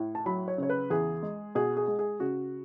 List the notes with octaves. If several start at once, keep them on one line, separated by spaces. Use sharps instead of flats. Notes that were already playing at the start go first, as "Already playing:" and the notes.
Already playing: A2
A5
F#3 B5
C#5
C#3 C#5
B4
E2 G#4
G#3
B2 G#4
G#4
G#3
G#4
C#3 F#4